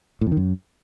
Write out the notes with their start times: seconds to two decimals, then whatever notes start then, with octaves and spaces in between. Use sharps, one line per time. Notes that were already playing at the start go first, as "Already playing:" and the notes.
0.21 A2
0.27 F2
0.32 D#3
0.37 F#2